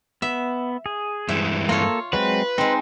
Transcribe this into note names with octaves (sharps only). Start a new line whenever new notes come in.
B3 E5
G#4
G2 E3 G#3 E5
A#3 F4 A4 C#5
F#3 G#3 C4 B4
G#3 C4 D#4